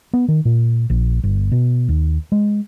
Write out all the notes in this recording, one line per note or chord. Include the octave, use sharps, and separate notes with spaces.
B3
D#3
A#2
A#1
G1
B2
D#2
G#3